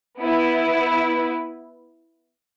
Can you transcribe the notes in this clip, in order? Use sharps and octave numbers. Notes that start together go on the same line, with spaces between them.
B3 E4 B4